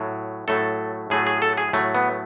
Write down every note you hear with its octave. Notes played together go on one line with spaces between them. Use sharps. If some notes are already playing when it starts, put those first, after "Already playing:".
Already playing: A2 F#3 A3
A2 F#3 A3 A4
A2 F#3 A3 G#4
G#4
A4
G#4
A2 F#3 A3
B3